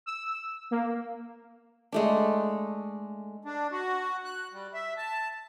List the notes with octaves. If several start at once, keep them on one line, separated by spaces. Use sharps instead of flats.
E6
A#3
G#3 A3 D4
D4
F#4
F#6
G3
E5
A5